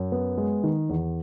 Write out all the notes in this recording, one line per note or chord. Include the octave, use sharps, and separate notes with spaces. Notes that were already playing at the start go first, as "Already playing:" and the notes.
Already playing: F#2
B3
G#3
D#3
E2